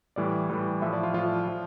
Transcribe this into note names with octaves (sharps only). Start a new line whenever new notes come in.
A2 E3 G3 D5
A2 E3 G3
A2 F3 E5
D5
F4
A2 F3 F4
F3